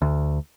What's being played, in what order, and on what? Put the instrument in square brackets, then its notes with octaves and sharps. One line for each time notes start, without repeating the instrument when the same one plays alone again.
[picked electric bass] D2